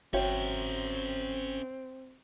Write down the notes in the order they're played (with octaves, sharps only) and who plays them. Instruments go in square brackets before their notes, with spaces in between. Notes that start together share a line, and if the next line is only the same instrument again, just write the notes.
[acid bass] G1 [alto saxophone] C4 [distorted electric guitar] C#4 E5 [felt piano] F#4 C#5 G5